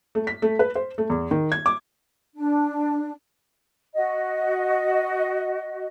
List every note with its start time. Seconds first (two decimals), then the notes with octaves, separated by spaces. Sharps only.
0.15 A3
0.27 B6
0.42 A3
0.59 B4
0.75 C5
0.98 A3
1.10 E2
1.31 D#3
1.52 G#6
1.66 D6
2.36 D4
3.95 F#4 D#5